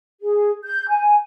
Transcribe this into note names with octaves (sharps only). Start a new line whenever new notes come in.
G#4
G6
G#5